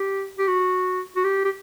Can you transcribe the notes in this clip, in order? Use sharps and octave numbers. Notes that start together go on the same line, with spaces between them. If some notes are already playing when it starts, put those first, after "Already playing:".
Already playing: G4
G4
F#4
F#4
G4
G4